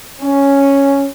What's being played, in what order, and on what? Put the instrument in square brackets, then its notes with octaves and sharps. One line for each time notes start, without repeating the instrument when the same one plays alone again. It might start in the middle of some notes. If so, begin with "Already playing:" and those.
[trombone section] C#4